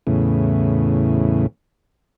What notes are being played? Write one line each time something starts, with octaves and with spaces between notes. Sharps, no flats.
E2 A2 C#3